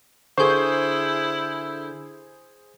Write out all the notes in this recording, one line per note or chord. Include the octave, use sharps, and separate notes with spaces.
D3 E4 G#4 A#4 C5 C6 C#6 G6